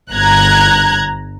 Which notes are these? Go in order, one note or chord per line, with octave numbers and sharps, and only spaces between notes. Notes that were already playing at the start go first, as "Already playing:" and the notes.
G1 A#5 F#6 G#6